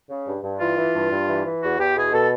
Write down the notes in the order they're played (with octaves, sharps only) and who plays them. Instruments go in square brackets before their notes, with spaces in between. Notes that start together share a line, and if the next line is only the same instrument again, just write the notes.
[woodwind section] C#3
G2
G2
E3 F4
E3
G2
G2
E3
E3
E2 F#4
E2 G4
B2 G#4
B2 A4